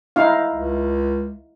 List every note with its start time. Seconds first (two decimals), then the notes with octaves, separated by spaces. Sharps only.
0.16 D#4 E4 F5
0.53 C#2